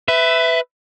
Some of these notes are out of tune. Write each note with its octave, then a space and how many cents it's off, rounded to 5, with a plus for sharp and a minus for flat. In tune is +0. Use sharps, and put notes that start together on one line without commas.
B4 +20 E5 +0